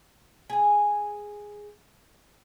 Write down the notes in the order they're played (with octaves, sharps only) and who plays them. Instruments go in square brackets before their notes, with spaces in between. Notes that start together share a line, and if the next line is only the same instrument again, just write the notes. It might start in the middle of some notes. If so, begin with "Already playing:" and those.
[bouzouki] G#4 G#5